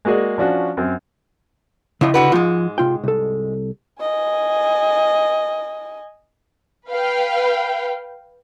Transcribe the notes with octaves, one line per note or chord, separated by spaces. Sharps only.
G#3 A#3 F#4 G#4 D5
F3 C#4 D4 F4 F#4
F#2 C4
F2 A2 C#3 E4 D#5
D3 F#4 B4
G#2 F3 G#3 F4
C3 F4 G5
C2 A4
D#5 G#5
B4 F5 G5